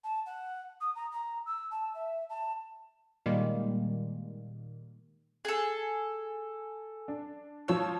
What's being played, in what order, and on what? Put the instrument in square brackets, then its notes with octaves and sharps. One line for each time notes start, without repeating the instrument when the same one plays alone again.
[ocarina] A5
F#5
D#6
A#5
A#5
E6
A5
E5
A5
[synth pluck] A#2 D#3 G3 G#3 A#3
[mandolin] G#4 A4
[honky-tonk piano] D4
[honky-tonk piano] F3 C#5 E7 [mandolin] E6